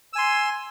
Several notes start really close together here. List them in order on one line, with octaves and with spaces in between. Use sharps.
E6 G#5 C6